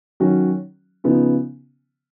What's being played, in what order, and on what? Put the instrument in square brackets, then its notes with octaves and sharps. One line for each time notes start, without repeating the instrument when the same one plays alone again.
[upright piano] D#3 F#3 C#4 F#4
C#3 F3 B3 D#4